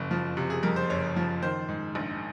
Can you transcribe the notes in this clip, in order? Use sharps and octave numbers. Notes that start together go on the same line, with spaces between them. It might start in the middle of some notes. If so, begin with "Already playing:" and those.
Already playing: F#1 F2
F3
C3
G#4
F2 A#4
C5
F#1 C#5
F3
D#3 C5
G#2
A#1